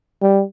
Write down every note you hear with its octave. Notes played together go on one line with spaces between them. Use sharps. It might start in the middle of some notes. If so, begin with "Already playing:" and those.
G3